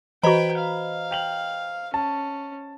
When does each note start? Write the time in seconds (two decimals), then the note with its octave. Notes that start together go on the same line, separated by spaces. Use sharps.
0.23 E3 F#4 B4 C5 D#5 G5 A#5 B5
0.58 F5
1.11 G5 F7 F#7
1.94 C#4 A5